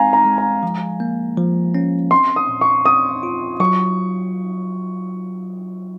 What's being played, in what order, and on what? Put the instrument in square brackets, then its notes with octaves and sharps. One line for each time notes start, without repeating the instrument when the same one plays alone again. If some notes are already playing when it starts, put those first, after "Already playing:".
Already playing: [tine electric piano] G#3 C4 D#4 [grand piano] F5 G#5 A#5
[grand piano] A#5
[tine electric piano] G#3
[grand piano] A#5
[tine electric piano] F3
A#3
F3
C#4
[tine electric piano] C4 [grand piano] C6
[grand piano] D#6
[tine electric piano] A#2
[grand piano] C#6
[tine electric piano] C4 [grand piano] D#6
[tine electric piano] F4
[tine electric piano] F#3 [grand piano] C#6